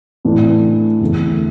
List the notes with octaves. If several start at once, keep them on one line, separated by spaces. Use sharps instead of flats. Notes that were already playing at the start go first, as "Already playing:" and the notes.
A2 E3 A3 D4
E2 D3 A3